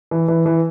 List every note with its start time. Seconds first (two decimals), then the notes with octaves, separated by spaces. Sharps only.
0.11 E3
0.28 E3
0.46 E3